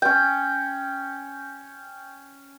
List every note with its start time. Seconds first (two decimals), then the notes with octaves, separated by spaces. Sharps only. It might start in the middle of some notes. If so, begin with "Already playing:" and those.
0.02 C#4 G5